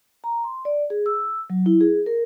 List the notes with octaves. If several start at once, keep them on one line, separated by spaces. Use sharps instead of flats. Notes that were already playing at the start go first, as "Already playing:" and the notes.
A#5
C6
D5
G#4
E6
F#3
E4
G#4
A#4